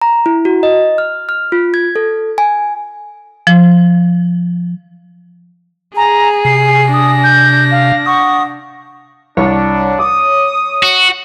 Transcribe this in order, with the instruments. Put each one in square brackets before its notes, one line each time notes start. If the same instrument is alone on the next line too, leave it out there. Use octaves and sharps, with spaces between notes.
[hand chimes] A#5
E4
F#4
D#5
F6
F6
F4
G#6
A4
G#5
[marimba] F3
[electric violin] G#4 [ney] G#5 [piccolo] A#5
[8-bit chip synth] C3 [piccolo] C7
[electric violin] D4 A#6 [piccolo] D#6
[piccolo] G6
F5
[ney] F#5 [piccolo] C#6 [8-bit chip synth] D#6
[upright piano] C2 [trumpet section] D4 [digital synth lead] C#5
[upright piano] D6 [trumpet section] D#6
[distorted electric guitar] F#4